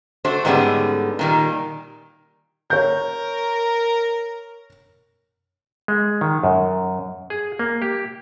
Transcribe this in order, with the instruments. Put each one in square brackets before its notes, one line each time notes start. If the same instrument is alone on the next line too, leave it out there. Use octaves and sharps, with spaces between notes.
[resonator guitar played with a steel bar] A3 D4 F#4 C5
G#2 D3 G3 B3 C#4 G#4
A#2 D#3 G3
[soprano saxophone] A#4 [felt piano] C#5 G6
[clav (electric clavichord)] G#3
D#3
F#2
G#4
A#3
G4